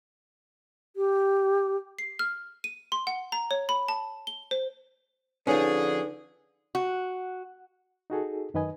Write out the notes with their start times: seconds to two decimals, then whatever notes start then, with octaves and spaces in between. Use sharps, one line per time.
0.96 G4
1.99 C7
2.19 F6
2.64 D#7
2.92 C6
3.07 F#5
3.32 A#5
3.51 C#5
3.69 B5
3.88 A5
4.27 G7
4.51 C5
5.47 D3 F3 C#4 D#4 G#4 B4
6.75 F#4
8.10 D#4 F#4 G#4 A4
8.54 F#2 D#3 D#4 B4 D#5 G#5